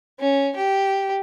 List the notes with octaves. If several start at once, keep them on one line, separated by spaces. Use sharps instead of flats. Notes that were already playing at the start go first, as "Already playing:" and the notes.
C#4
G4